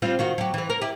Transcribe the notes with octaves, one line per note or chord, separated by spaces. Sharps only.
G3 C4 F4
D#3 F4 F#4
F#3 G4
E3 C4
A#4
E4 G4